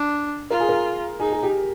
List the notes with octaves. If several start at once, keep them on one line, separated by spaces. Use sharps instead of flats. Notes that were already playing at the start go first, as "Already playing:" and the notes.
Already playing: D4
F4 A#4
G#4
A#4
D#4 G#4
G#4
G4